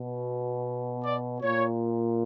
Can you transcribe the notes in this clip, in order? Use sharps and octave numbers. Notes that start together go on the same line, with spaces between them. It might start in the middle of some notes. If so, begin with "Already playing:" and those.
Already playing: B2
D5
A#2 C#5